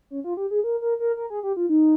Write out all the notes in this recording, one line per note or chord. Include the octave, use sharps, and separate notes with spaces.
C#4
F4
G4
G#4
A#4
A#4
A#4
A#4
G#4
G4
F4
D#4